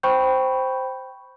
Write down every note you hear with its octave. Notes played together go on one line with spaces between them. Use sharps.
C5 G5 B5 C#6 G6